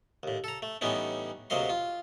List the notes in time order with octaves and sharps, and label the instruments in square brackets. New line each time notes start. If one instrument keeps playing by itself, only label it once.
[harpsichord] D#2 A2
A4 A#5
A3
A2 E3 G3 B3 C#4 D#4
D2 C3 F#3 A#3 D#5 C6
F4